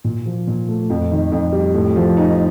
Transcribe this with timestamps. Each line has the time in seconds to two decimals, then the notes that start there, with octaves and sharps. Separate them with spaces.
0.04 A#2
0.26 F3
0.47 A#2
0.68 A3
0.90 F2
1.11 D#3
1.32 F2
1.53 G3
1.74 A2
1.96 F3
2.17 D#4